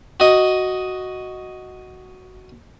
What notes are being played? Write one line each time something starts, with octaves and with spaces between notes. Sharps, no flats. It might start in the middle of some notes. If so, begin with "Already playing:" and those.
F#4 D#5